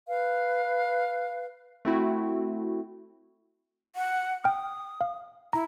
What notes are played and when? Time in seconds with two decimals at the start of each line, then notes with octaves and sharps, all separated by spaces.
0.08 B4 F5
1.85 A3 C4 E4 F#4
3.96 F#5
4.44 G5 D#6 F6
5.01 F5
5.53 E4 A#5